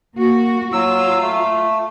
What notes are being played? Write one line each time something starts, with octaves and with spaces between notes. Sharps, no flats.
A#3 F#4
F#3 F4 E6
A3